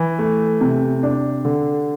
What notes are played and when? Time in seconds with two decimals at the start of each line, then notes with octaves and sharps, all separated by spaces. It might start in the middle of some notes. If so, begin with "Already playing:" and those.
Already playing: E3
0.19 A3
0.61 C3
1.03 D4
1.45 D3